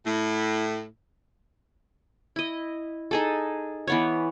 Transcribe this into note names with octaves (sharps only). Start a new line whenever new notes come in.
A2
E4 D#5
D#4 G#4 A4
E3 B3 C#5